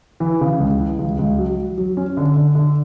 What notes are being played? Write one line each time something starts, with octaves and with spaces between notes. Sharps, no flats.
E3
C#3
C#2
E3
C#2
C#2
F#3
F#3
F#3
C#4
D3
D3
D3